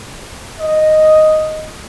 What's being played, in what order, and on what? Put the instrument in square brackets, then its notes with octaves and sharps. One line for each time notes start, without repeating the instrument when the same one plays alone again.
[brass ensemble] D#5